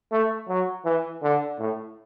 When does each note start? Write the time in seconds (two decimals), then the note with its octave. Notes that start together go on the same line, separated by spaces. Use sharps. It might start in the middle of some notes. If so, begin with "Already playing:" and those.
0.12 A3
0.48 F#3
0.85 E3
1.23 D3
1.59 A2